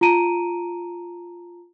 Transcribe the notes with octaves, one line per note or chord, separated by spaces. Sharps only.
F4 A5 A#5 D7 D#7